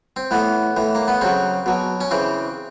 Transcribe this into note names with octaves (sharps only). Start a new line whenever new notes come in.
C4
A2 E3 B3
A2 E3
A#3
B3
C#3 F#3 C4
B2 F#3
C#4
C#3 E3 C4